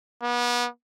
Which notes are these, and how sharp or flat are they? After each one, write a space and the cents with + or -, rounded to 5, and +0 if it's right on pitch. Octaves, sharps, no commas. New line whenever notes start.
B3 -30